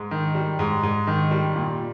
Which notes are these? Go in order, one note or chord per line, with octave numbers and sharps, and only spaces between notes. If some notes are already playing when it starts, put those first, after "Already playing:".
Already playing: G#2
D#3
G3
G#2
G#2
D#3
G3
A#2